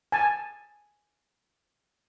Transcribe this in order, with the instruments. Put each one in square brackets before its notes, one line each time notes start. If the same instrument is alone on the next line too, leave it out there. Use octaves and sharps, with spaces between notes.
[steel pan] G#5 A5